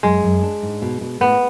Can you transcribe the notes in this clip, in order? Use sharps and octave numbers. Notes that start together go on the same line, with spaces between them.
F#2 G#3
F#2
D4
G#2
B2
B2
A2 B3